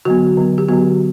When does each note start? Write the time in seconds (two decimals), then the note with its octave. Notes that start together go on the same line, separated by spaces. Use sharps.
0.05 D3 F#3 B3 F#4
0.37 D3 F#3 B3
0.58 G4
0.68 D3 F#3 B3 F#4